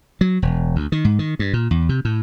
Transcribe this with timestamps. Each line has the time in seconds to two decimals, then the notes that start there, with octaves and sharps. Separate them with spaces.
0.21 F#3
0.42 E1
0.76 D2
0.92 D#3
1.05 G#2
1.19 D#3
1.39 G2
1.53 A#2
1.71 E2
1.89 C3
2.05 A2